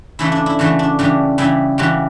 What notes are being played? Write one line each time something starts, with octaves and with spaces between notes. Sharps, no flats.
C#3 E3 A3 E4
D4
E4
C#3 E3 A3 F#4
D4
C#3 E3 G3 D4
C#3 E3 G3 E4
C#3 E3 G3 F#4